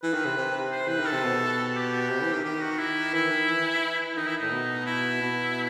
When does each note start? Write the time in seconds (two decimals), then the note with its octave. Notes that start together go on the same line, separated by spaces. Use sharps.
0.03 E3 B4
0.14 D#3
0.25 C3
0.38 C3
0.72 C5
0.87 E3 B4
0.99 D#3
1.06 A4
1.12 C3
1.23 B2
1.76 G4
2.10 C3
2.22 E3
2.33 D#3
2.44 D#3 G4
2.62 F#4
2.79 E4
3.14 E3 E4
3.31 D#3
3.49 E3
4.17 D#3 D#4
4.27 E4
4.37 A2 D#4
4.52 B2
4.86 E4
5.22 B2